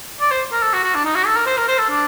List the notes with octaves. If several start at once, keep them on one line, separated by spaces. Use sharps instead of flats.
D5
C5
A#4
A4
F#4
F#4
D4
D#4
F#4
A4
A#4
C5
A#4
C5
A4
D4